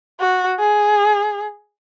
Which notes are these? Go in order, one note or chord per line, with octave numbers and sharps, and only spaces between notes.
F#4
G#4